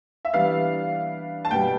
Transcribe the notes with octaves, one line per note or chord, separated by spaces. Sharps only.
E5
E3 G3 B3 D4 F5
A5
B2 G3 B3 G5